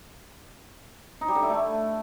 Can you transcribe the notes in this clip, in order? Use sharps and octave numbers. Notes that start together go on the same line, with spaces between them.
D#4
G3
D3
E4
A3